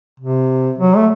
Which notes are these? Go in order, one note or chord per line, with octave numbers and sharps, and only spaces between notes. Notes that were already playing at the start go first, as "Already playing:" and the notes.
C3
F#3
A3